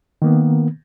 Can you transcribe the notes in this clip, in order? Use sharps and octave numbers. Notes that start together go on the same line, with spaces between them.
D#3 A#3 B3